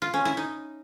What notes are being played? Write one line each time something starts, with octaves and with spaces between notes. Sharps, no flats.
F4
C#4
E4
D#4